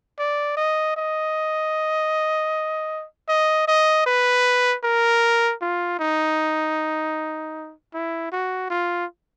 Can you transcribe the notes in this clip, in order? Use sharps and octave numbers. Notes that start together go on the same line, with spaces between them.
D5
D#5
D#5
D#5
D#5
B4
A#4
F4
D#4
E4
F#4
F4